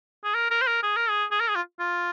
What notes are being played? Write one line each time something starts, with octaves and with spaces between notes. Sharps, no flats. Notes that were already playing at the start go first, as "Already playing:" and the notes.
G#4
A#4
A#4
C5
A#4
G#4
A#4
G#4
G#4
A#4
G#4
F4
F4